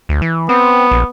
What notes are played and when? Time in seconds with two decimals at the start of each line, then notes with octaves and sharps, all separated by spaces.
0.09 D2
0.22 E3
0.49 B3 C4
0.91 A#1